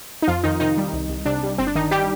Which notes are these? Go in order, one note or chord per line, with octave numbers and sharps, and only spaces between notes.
D#4
F2 F3 F4
F2 D#3 D#4
C3 D#3 D#4
G3
C2
C2
C3 D4
G3
G1 C4
D4
G1 D#3 D#4
G3 G4